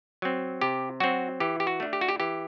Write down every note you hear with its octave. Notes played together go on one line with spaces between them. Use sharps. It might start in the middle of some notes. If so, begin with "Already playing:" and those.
F#3 C4
C3 G4
F#3 C4 F#4
E3 G4
G4
F#4
A3 D4
G4
F#4
G4
E3 G4